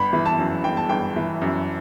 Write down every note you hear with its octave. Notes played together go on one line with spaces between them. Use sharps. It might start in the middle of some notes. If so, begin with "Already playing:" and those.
Already playing: G1 B5
E3
A5
F#2
G1 G5
A5
G1 G5
E3
F#2